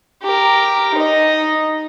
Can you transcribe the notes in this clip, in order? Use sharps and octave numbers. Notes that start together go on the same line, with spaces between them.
G4 A#4
D#4 D#5